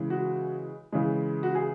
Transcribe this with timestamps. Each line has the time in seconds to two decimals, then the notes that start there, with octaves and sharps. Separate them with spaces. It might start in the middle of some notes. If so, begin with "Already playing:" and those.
Already playing: C#3 E3 G#3
0.10 F#4
0.92 C#3 E3 G#3
1.43 F#4
1.55 G#4